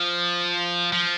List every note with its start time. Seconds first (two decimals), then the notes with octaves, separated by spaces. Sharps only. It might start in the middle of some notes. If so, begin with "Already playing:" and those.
Already playing: F3
0.93 F3